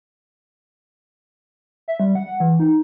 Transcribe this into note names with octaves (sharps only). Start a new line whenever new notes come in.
E5
G3
F#5
E3
D#4